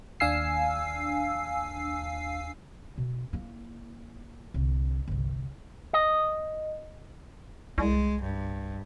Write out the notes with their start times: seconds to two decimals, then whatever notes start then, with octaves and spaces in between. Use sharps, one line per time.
0.20 D#2 D4 F5 G#5 E6 C7
2.98 B2
3.33 A#3 E4
4.54 C2 D3
5.07 G1 C2
5.93 D#5
7.78 C2 G#3
8.22 G2